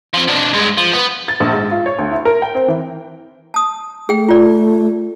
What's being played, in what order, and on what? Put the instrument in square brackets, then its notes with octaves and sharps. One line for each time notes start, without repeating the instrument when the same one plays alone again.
[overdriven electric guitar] F3 C4
B2 D4
G2 G#3
F3
B3
[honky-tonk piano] A6
A#1
G#2
F4
C#5
D2
E4
A#4
G5
C4
E3
[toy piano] A5 D#6
[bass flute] A3 [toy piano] G#4 G5
[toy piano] F4 D5